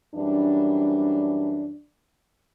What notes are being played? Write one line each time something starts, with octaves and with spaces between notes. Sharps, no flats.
F#2 E3 G3 D4